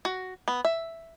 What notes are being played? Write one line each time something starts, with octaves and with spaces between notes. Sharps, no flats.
F#4
B3
E5